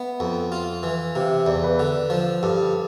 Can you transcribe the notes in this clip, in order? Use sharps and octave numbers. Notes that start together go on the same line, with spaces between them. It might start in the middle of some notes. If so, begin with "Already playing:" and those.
Already playing: B3 E5
F2
F4
E3
C3 F5
E5
E2 D5
B4
D3
F3
G2 A4